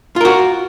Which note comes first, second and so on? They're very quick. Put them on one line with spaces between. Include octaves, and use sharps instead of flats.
F4 A#4 F#4